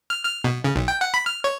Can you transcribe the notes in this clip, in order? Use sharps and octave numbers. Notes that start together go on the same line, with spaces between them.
F6
F6
B2
C#3
B1
G5
F#5
B5
F6
C#5